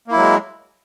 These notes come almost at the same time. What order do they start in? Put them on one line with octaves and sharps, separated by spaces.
A#3 E4 F#3 G#3